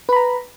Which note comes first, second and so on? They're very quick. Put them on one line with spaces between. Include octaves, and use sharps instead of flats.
B4 B5 A#5